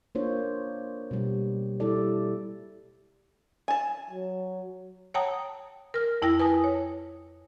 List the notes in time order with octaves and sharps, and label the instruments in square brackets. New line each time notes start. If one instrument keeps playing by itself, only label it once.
[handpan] A#3 D4 F4 C5 C#5
B2 G3
G3 E4 A4 D5
[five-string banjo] G#5 A5
[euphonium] F#3
[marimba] C#5 F#5 G5 A5 A#5 D#6
A#4 F6
F2 E4 G5 A#6
B4 G#5 A5 D#6
C#5